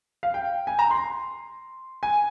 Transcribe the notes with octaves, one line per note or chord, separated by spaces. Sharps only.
F5
G5
G#5
A#5
C6
G#5